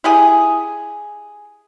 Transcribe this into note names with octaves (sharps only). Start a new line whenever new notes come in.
E4 G4 G#4